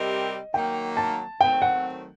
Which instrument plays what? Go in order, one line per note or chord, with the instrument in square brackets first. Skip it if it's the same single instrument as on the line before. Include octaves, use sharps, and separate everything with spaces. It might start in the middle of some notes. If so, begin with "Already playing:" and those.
Already playing: [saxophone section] C3 G3 C4 G4 A#4 [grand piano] D#5
[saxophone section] D#3 F#3 A#3 D#4 [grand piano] G5
[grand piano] A5
[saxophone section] D#3 F#3 A3 C4 [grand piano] G5
[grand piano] F#5